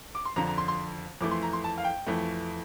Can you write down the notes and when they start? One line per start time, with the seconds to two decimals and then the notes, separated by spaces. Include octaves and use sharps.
0.15 D6
0.25 C6
0.36 F2 D3 F3 A#5
0.47 A#5
0.58 C6
0.68 C6
1.21 F2 E3 A3 D6
1.31 C6
1.42 A#5
1.53 C6
1.64 A5
1.78 F5
1.84 G5
2.07 F2 E3 A3